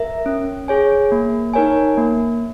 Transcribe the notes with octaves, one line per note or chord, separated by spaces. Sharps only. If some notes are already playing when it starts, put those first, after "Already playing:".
Already playing: A#4 E5
C#4
G#4 C#5 G#5
A#3
D#4 A#4 C#5 G#5
A#3